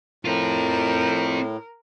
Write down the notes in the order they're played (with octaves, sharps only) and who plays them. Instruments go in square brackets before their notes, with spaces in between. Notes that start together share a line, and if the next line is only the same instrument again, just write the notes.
[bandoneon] A2 [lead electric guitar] C4 F4 [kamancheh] A#4